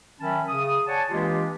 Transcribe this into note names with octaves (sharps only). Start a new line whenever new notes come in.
D#3 F#3 C#4 E5 A5 B5
C#3 D#6
C#5 D5 F#5 G#5 A5
E3 G#3 A#3 D4 F4 G4